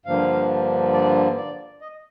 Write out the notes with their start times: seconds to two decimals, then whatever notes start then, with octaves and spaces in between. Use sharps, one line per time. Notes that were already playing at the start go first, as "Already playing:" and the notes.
0.05 G2 D3 F3 A#3 F5
0.93 D5
1.37 D5
1.81 D#5